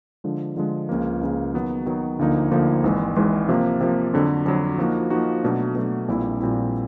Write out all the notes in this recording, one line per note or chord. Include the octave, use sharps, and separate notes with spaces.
D3 F3 G#3
D3 F3 G#3
C#2 C#3 F3 A#3
C#2 C#3 F3 A#3
D#3 F#3 B3
D#3 F#3 B3
D2 D3 F3 A#3 D#4
D2 D3 F3 A#3 D#4
G#1 G#2 E3 G#3
G#1 G#2 E3 G#3
C3 F3 A#3
C3 F3 A#3
F2 D3 F#3
F2 D3 F#3
F3 A#3 D#4 F#4
F3 A#3 D#4 F#4
B2 F#3 A3 D4
B2 F#3 A3 D4
A#1 A#2 G3 C4 E4
A#1 A#2 G3 C4 E4